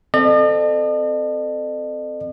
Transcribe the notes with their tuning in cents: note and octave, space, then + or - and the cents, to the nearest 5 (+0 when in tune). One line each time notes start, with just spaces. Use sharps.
C4 -15 A4 +0 D#5 -45